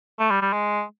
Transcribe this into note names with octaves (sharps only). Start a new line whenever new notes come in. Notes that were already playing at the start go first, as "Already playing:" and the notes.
A3
G3
G3
G#3